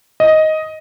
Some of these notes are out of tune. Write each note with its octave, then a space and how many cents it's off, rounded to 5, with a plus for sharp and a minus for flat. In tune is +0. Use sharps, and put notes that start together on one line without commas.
D#5 +10